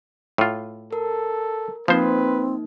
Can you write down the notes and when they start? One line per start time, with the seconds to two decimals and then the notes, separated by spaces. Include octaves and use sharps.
0.38 A2 F4
0.93 A4 A#4
1.88 F3 A#3 C4 D#4 B4 C5